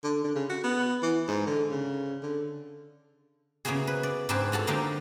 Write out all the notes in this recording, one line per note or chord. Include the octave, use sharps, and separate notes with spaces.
D3
D3
C#3
F#4
B3
E3
G#2
D3
C#3
D3
C#3 A#3 B3 E4 F#4 G#4
B4
D5
G#2 C4 D4 G#4 B4 A5
F4 F#4 A4 A5
D3 F3 A#3 D4 D#4 G4